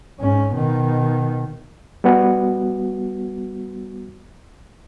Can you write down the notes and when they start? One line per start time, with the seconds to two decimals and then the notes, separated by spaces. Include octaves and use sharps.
0.19 G#2 C#4
0.54 B2 D#3
2.04 G3 B3 F#4